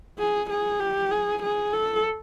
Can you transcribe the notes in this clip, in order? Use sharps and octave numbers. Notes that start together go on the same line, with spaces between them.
G#4
G#4
G4
G#4
G#4
A4